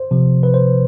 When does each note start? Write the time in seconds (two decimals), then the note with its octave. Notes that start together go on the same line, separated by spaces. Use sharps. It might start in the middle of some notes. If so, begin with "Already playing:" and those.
Already playing: C5
0.11 C3 F3
0.43 B4
0.54 C5